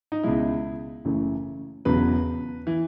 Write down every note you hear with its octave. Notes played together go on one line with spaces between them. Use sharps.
D#4
C#2 B2 G#3 E4
F#1 F#2 C#3 E3 A3
E1 E2 C#3 F#3 B4
E3